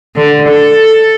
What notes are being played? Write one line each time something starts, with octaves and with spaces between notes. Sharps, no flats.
D3
A4